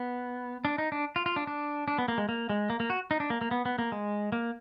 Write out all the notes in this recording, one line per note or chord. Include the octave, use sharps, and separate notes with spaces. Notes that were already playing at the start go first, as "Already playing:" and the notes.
Already playing: B3
D4
D#4
D4
F4
F4
D4
D4
D4
B3
A#3
G#3
A#3
G#3
A#3
A#3
F#4
D#4
D4
A#3
A#3
B3
B3
A#3
G#3
A#3